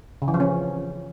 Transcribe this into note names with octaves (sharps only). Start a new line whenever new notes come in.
C#3
E3
F3
C#4